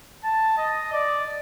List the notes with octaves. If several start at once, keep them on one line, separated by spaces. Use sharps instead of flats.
A5
D#5
D5